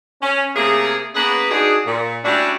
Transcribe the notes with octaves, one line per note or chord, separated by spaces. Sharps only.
C#4
C3 A3 A#3 G#4
A#3 B3 C#4 G#4 B4
D4 D#4 F#4 G#4
A#2
G3 A3 C#4 D4 E4 F#4